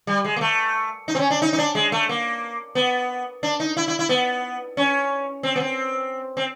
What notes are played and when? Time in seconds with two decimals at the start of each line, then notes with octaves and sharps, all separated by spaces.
0.07 G3
0.25 G#3
0.36 A#3
0.41 A3
1.08 D#4
1.15 C4
1.19 C#4
1.31 D4
1.42 D#4
1.53 D#4
1.58 D4
1.75 G#3
1.92 A3
2.09 A#3
2.75 B3
3.43 D4
3.60 D#4
3.77 E4
3.88 E4
3.99 E4
4.09 B3
4.77 C#4
5.43 C4
5.56 B3
5.60 C4
6.37 C4